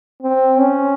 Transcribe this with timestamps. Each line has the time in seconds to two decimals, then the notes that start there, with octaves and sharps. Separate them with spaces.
0.23 C4
0.59 C#4